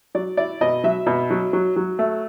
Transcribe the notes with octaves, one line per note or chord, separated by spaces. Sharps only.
F#3 D5
E4 D5
B2 D#5
F#3 E5
B2
F#3
F#3
F#3
A3